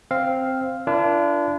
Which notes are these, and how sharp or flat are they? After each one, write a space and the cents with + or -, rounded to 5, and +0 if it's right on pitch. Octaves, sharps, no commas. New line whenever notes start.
C4 +0 F5 +0
D4 -10 F4 -45 A#4 +0